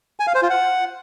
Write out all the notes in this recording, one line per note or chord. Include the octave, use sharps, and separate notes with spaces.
G#5
F5
C5
F4
F#5